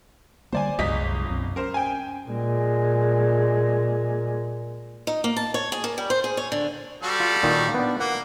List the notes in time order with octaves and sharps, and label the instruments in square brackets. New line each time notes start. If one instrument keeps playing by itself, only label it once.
[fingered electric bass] D3 G3 A#3 [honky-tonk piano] C5 D5 G#5
[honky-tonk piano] G1 D#5 B6 [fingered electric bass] C2 F#2 G#3
[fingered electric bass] B1 F#2 C4
[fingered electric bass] C#4 [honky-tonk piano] A#4 C5
[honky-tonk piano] G5 G#5
[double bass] A#2 G#3
[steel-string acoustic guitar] D#4
A#3
A5
C#5
G#4
A#3
G3
C5
G#4
C#5
D3
[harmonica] G3 F#4 A4
[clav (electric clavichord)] F4
A#2 D#3 D#4
B3 D4
[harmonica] A#3 [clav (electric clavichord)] F#5